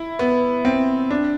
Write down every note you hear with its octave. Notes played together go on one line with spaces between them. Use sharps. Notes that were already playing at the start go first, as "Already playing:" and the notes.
Already playing: E4
B3
C4
D4